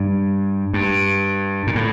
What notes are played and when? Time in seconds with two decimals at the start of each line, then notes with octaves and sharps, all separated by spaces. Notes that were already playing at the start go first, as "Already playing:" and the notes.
Already playing: G2
0.74 G2
1.67 A#2
1.75 A2